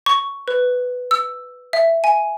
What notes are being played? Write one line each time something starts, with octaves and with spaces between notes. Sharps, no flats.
C#6
B4
E6
E5
G#5